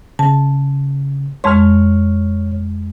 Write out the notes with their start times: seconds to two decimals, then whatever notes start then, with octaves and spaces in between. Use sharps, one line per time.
0.19 C#3 A5
1.44 F2 G#3 C#5 C6 F6